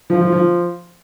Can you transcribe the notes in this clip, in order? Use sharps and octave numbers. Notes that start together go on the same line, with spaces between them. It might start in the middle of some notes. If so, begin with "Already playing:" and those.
F3
F3
F3